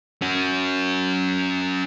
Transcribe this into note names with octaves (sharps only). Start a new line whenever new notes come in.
C#4 F#4